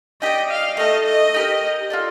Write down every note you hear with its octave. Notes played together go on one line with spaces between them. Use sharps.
D#4 G4 D5 D#5 G5
F5
A3 D#4 A4 D#5
D#5
D#4 G4 A#4
F4 A4 D5